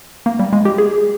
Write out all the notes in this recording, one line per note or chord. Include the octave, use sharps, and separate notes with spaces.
A#3
G3
G#3
G4
G#4